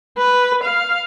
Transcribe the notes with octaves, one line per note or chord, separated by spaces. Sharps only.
B4
F5